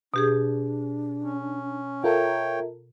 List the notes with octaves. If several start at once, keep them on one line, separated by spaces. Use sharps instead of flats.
B2 D4 G4 G#4
C#4
F4 A4 A#4 C#5 E5 G5